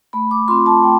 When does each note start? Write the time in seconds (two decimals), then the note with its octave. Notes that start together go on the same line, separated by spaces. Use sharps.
0.13 A3 B5
0.31 D6
0.48 C4 F4 C6
0.66 A5
0.83 A3 G5